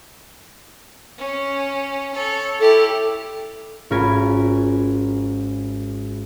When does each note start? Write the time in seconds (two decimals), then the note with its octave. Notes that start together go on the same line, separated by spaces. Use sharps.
1.18 C#4
2.12 A4 C#5
2.60 E4 G4 A4
3.90 G#1 C#4 F4 A#4 G#5 B5